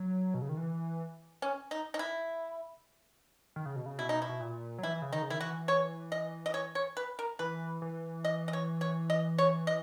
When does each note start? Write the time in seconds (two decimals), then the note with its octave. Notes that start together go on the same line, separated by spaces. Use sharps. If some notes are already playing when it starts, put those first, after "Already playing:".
Already playing: F#3
0.34 B2
0.42 C#3
0.49 D#3
0.57 E3
1.42 C#4
1.71 D#4
1.94 D#4
1.99 E4
3.56 D#3
3.66 C#3
3.76 B2
3.86 C#3
3.98 B2 E4
4.09 D#4
4.22 E4
4.29 B2
4.40 A#2
4.79 F#3
4.83 E3 E4
5.02 C#3
5.12 D#3 D#4
5.22 C#3
5.30 D#3 E4
5.41 E3 F#4
5.68 C#5
6.12 D#5
6.46 D#5
6.54 C#5
6.75 C#5
6.97 B4
7.19 A#4
7.39 E3 B4
7.82 E3
8.24 D#5
8.48 D#5
8.53 C#5
8.81 C#5
9.10 D#5
9.38 C#5
9.67 D#5